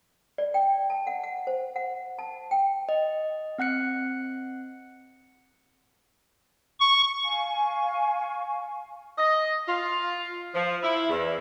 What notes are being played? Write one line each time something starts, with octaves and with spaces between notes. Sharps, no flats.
D5
G5
A5
F#5
F#5
C5
F#5
A5
G5
D#5
C4 F#5 F#6 C#7
C#6
F5 G#5 C#6
D#5
F4
F3
E4
E2